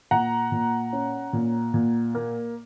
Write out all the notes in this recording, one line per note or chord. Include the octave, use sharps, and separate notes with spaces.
A#2 F#5 A#5
A#2
C#4
A#2
A#2
A#3